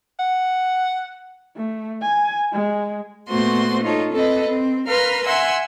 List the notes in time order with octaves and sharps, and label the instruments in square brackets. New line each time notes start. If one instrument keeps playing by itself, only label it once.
[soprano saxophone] F#5
[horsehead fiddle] A3
G#5
G#3
[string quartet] A#2 A3 B3 F#4 C5 C6
D#4 F4 A4 C#5
C4 A4 B4 D#5
C4
A#4 B4 F5 B5 C6 F6
E5 F#5 G#5 C6 E6